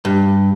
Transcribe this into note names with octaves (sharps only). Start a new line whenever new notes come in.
G2